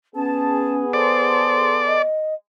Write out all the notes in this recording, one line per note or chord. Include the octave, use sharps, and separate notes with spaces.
B3 C#4 G#4 A5
A4 C5 D5 C6
D#5